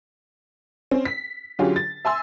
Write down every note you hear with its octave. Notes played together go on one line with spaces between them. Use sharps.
C4 C#4
B6
D3 F#3 C#4 F4 G4 G#4
A6
E5 G#5 C6 E6